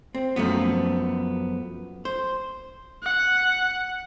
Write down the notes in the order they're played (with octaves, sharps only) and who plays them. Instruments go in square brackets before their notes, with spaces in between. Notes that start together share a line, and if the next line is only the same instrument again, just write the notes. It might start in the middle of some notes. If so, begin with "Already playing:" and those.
[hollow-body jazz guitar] C4
F#2 F3 A3 B3
C5
[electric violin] F#5